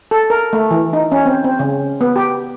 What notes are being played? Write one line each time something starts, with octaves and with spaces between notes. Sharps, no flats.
A4
A#4
A3
E3
D#4
C#4
C4
C4
C#3
B3
G4